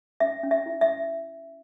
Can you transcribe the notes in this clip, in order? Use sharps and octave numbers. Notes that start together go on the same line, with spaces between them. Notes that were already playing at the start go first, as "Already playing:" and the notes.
C#4 E5
C#4
E5
E4
E5